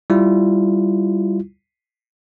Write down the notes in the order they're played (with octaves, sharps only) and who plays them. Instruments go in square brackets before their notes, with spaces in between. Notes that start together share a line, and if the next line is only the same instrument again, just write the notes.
[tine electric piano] G3 E4 F4